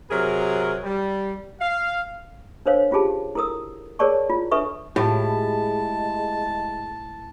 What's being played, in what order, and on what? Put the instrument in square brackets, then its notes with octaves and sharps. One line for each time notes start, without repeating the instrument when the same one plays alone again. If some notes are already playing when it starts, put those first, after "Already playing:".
[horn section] C3 F#3 G#4 A#4
G3
F5
[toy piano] D4 A#4 C5 C#5 F5
C#4 F4 G4 G#4 A5
E4 A4 A#4 D#6 E6
G#4 A#4 C#5 D5 A5 C#6
E4 F4
D4 A4 B4 E5 C#6
[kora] A2 [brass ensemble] G#3 [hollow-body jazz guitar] E4 F4 G4 [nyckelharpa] A5